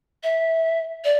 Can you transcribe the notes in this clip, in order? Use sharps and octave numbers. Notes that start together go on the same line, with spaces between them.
E5
D5